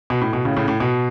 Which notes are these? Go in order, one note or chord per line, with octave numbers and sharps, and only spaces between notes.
B2
A2
B2
A2 C#3
A2 C#3
A2
B2